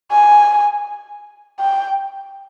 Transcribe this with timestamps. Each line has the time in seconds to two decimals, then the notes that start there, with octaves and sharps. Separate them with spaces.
0.12 G#5
1.59 G5